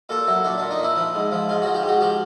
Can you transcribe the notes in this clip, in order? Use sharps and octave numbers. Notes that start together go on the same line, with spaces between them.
A#2 A4
F#3 E4
A#2 D4
A#2 D4
D#4
A#2 E4
F3
G#2
F3
G#2 F4
F3 F#4
G4
G#2 F#4
F3 G4